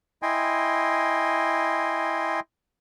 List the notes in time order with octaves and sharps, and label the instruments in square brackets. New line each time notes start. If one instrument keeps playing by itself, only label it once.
[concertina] E4 D#5 G5 G#5 C6